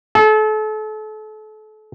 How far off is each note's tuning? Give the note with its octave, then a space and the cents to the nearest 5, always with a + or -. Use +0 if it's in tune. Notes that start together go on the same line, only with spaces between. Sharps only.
A4 -35